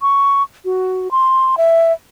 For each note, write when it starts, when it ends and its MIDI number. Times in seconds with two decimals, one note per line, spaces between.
0.02 0.43 85
0.65 1.11 66
1.11 1.55 84
1.57 1.93 76